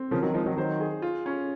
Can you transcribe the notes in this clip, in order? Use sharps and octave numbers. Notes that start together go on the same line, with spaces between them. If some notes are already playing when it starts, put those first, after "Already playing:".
Already playing: C4
C#3 F3 A#4
D#3 F#3
F3 G#3 D#4
D#3 F#3
D#3 F#3 C5
G#4
F4
C#4